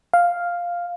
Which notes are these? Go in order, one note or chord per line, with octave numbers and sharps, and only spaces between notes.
F5